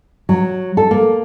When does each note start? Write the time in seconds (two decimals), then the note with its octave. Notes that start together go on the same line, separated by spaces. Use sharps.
0.29 F#3
0.77 A4
0.91 A#3